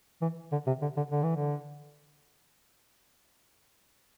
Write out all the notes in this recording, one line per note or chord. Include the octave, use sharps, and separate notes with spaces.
E3
D3
C3
D3
D3
D3
E3
D3